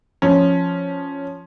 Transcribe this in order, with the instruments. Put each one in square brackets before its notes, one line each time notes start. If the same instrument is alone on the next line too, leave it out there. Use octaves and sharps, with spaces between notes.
[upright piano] F3 C#4